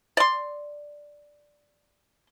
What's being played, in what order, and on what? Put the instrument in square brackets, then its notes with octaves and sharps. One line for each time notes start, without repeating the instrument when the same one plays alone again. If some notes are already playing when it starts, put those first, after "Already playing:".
[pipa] D5 C6